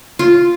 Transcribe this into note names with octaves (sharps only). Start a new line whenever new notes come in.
F4